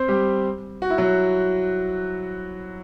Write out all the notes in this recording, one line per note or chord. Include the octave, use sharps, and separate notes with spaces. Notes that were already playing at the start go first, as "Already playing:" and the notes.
Already playing: C4 C5
G3 G4
F#4
E4
F#3 F#4